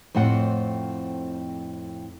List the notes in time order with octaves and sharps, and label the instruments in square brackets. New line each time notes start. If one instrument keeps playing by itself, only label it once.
[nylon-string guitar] F2 A2 C4 F#5